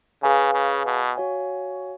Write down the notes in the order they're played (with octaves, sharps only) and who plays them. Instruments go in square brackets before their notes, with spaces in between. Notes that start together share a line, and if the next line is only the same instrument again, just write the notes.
[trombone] C#3 [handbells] G#4 B4 F5 G#5
[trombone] C#3
B2
[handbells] F#4 C#5 F5 G#5